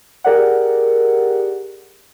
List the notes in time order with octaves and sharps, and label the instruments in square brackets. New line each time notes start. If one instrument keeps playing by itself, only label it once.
[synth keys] G4 G#4 A#4 D5 F#5